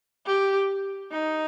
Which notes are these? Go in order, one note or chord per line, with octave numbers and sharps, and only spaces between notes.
G4
D#4